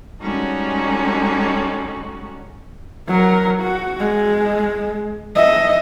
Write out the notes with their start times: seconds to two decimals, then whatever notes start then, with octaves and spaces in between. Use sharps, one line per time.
0.21 G3 G#3 C#4 D#4 F#4 A4
3.08 F#3 A#4
3.60 F#4
4.00 G#3
5.35 D#5 E5